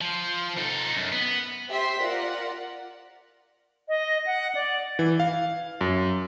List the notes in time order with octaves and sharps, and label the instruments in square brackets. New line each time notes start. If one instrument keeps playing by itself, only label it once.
[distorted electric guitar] F3
D#4 A4
F#2
B3
[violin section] G4 C5 E5 C6 B6
F4 A#4 D5 F#5
[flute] D#5
F#5
D5
[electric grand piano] E3
F5
F#2